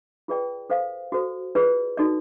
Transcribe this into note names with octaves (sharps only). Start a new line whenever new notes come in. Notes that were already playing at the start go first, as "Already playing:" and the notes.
F4 G#4 B4 D5 G5
A4 C5 F5
F#4 A4 C5
F4 G#4 B4 D5
D#4 F#4 A4 D5